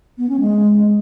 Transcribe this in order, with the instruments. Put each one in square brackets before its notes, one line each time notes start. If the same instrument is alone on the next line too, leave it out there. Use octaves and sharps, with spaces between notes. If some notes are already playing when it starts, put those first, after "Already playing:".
[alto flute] B3
C#4
G#3